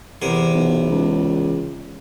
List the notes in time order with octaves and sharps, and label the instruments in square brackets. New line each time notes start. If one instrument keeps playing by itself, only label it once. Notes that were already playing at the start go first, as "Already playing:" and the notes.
[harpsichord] E2 C3 A#4
[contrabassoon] B1
C#2